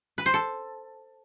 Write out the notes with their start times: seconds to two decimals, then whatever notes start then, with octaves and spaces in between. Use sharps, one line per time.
0.18 B4
0.26 C5
0.34 A4